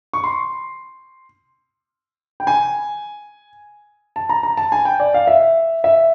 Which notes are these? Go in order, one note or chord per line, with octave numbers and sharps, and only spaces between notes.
C#6
C6
G5
G#5
A5
A#5
A#5
A5
G#5
G5
D5
F5
E5
E5